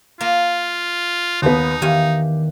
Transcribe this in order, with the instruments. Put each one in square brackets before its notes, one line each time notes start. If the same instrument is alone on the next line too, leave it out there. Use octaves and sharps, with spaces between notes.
[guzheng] A#3 [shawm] F4
[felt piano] D#2 B3 [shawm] D#4
[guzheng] E2 F5 G#5 [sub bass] D#3 [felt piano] G4